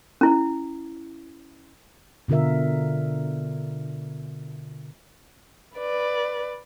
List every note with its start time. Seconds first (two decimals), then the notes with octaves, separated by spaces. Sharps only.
0.21 C#4 E4
2.28 B2 D3 F4 A#4 E5
5.76 B4 D5